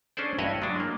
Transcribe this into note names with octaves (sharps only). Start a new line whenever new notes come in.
C#4 D4 G#4 A4 C5 D5
G2 E4 F#4 B4 C#5 D#5
F#3 G#3 D4
A#3